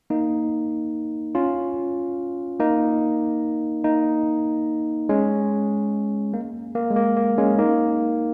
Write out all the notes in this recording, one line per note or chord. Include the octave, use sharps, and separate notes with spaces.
A#3 D#4
C#4 F4
A#3 D#4
A#3 D#4
G#3 C#4
A#3
A#3
G#3
A#3
A#3
G#3 C#4
A#3 D#4